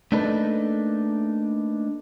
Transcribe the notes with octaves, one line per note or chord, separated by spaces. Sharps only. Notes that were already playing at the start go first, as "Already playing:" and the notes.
A3 A#3 D4 D#4 A4 B4